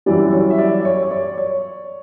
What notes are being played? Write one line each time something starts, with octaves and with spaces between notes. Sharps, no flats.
F#2 E3 G3 D5
C#5
E5
D5
C#5
C#5
D5
C#5